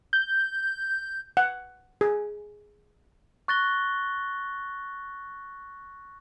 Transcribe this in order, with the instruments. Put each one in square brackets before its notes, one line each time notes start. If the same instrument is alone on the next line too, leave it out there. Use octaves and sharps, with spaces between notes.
[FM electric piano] G6
[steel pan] F#5
G#4
[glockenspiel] C#6 F#6 A6 A#6 G7